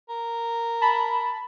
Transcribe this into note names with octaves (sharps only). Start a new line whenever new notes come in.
A#4
A5 B5